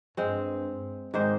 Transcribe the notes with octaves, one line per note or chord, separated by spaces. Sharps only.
G2 G#3 C4
G#2 D#3 G#3 C5